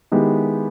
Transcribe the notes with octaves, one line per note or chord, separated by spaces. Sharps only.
D#3 G#3 B3 E4 G4